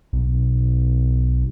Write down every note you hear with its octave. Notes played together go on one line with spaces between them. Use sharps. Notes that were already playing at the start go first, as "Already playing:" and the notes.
B1